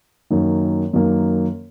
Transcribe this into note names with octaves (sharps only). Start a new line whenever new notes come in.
F#2 D#3 A#3
F#2 D#3 A#3